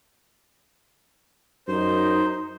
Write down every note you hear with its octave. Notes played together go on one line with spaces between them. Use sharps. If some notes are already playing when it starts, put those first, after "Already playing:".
F#2 D#4 C5